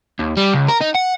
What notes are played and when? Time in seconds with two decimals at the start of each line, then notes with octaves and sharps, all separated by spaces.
0.20 D#2
0.37 G3
0.54 C#2
0.69 A#4
0.81 D#4
0.95 F#5